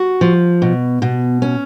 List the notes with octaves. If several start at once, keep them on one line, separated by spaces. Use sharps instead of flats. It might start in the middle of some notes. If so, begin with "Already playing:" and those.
Already playing: F#4
F3
B2
B2
C#4